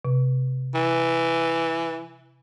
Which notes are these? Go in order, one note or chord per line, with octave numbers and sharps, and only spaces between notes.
C3
E3